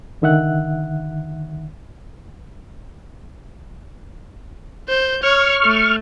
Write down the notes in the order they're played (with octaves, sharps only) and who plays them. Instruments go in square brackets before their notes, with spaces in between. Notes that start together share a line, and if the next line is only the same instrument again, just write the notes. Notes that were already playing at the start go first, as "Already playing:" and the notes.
[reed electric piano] C#2 D3 D#3 E5 F#5 F#6
[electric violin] C5 G6
[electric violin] C#5 [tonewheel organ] C#6 F6
[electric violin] A3